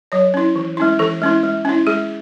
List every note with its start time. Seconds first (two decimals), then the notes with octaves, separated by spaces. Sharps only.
0.12 F#3 C#5
0.34 C#4 E4
0.56 E3
0.77 G#3 C#4 E4
0.99 E3 A4
1.22 G#3 C#4 E4
1.43 G#3
1.65 C#4 E4
1.87 G#3 G#4